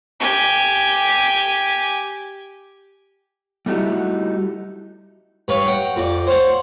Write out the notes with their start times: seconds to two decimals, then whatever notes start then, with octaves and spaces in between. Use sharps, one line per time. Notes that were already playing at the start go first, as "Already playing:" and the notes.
0.20 G4 G#5
3.66 G3 A3 D#4 E4 F#4 G4
5.48 G2 B4 C#5 F5
5.66 F#5 G5
5.96 F2 D5
6.27 C5 C#5 F5 F#5